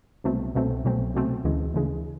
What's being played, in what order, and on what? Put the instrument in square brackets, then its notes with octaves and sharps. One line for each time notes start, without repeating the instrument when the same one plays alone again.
[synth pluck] C2 B2 F#3 A3 C4
C2 B2 F#3 A3 C4
C2 B2 F#3 A3 C4
C2 B2 F#3 A3 C4
D2 C#3 E3 G#3
D2 C#3 E3 G#3